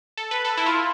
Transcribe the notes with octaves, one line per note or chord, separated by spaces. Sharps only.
A4
B4
A4
E4
F4